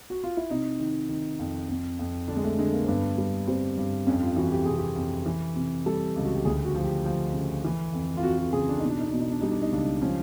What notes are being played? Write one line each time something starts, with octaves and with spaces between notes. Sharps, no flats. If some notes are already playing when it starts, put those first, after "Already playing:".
F#4
F4
E4
C3 D#4
D#3
D#3
F2
F2
F2
D3 D4
G#3
A3
D3 G#3
A#3
C4
G2 B3
G3
G3 C4
G2
F2 C#4
F4
E3 F#4
G4
C3 G#4
G4
F2
E3
C3
G3 A4
C#2
F#4
G4
D2 G#4
F#4
F3
G4
F3
C#3
E3
F2
F4
F2 F#4
F#4
C#3 G#4
D4
B2 D#4
D4
D#4
B2 D4
D#4
D4
G3 D#4
D4
D#4
C#2 D4
F3 C#4